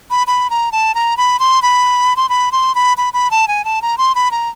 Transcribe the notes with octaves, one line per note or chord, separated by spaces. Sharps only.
B5
B5
A#5
A5
A#5
B5
C6
B5
C6
B5
C6
B5
B5
B5
A5
G#5
A5
A#5
C6
B5
A#5